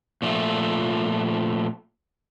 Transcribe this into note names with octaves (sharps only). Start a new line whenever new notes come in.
A#2 F3 A3